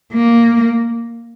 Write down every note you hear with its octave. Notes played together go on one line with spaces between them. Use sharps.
A#3